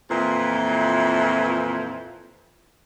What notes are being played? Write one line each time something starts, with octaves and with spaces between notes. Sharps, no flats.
F2 A#2 E3